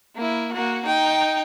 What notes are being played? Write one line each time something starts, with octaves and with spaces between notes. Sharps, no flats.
A#3 E4
A#3 F#4
D#4 G5